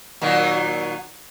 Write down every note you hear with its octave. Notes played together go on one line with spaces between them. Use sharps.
A#2 D#3 F#3